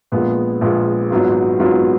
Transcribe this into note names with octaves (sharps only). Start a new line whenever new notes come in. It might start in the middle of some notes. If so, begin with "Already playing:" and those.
A#1 A#2 G#3 B3 F4
A#1 A#2 G#3 B3 F4
G#1 G#2 F#3 B3 F4
G#1 G#2 F#3 B3 F4